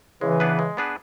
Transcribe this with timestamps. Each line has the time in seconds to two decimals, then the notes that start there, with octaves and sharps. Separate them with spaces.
0.21 C#3 E3 G#3
0.40 B3 D4 G#4 B4
0.59 G#3
0.77 B3 D4 G#4 B4